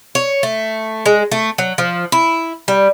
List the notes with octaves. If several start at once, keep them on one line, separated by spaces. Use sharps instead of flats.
C#5
A3
G#3
A3
F#3
F3
E4
G3